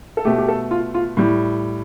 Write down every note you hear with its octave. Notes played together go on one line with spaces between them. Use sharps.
A4
B2 A3 G4
G4
A4
F4
F4
A2 G3